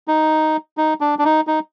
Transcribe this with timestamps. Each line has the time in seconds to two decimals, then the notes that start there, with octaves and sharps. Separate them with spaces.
0.08 D#4
0.77 D#4
1.01 D4
1.19 D4
1.24 D#4
1.47 D#4